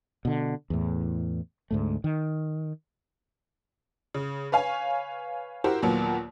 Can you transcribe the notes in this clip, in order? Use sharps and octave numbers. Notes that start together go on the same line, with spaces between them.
B2 D3
E2 A2
D2 G#2 A3
D#3
C#3
B4 C#5 F5 G#5
E4 F#4 G4 A#4 C5
D#2 A#2 F#3 A#3 B3